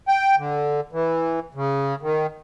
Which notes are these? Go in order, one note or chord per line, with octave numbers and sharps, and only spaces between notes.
G5
D3
E3
C#3
D#3